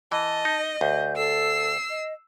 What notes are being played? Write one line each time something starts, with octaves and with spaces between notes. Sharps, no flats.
E3 D#5 A5
D#4
D2 G6
A4 E6 C7
D#5